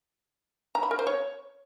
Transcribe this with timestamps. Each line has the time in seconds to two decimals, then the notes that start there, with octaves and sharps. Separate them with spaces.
0.75 A#5
0.83 B5
0.91 A#4
0.99 C5
1.07 C#5